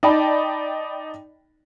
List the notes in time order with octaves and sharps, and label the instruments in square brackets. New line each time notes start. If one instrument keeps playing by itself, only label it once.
[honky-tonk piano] D#4 D5 D#5 G5 A5 B5